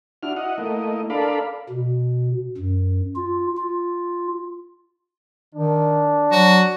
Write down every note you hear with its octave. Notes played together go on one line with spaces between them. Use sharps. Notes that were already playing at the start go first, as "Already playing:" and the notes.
D4 E4 F#4 F6
E4 D#5 F#5
A3 A#3 E4 D#5
D4 A4 A#4 D5 F5 B5
B2
F#2
F4
F4
D#3 D4
F#3 F#4